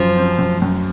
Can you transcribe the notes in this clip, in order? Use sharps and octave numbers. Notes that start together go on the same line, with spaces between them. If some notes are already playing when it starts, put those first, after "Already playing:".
Already playing: F#2 F3
C4
F#2
F#2